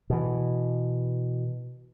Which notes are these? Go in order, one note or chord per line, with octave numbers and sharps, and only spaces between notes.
B2 E3